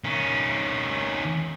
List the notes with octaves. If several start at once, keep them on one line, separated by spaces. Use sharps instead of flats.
D#3 C#4